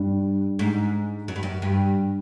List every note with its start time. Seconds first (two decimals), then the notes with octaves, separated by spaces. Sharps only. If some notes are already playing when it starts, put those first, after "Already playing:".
Already playing: G2
0.59 G#2
1.28 F#2
1.36 G2
1.43 F#2
1.62 G2